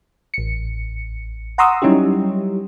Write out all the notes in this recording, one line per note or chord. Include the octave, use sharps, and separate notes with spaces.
A1 C#7
F#5 A#5 C6 C#6 D#6 E6
F#3 G3 C#4 D#4 E4 G4